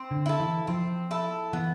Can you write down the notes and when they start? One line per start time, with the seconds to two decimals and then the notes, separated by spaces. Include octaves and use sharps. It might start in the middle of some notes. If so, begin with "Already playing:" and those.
Already playing: C4
0.11 D3
0.26 E4 A4
0.40 E3
0.67 F3 C4
1.11 E4 A4
1.53 E3 B3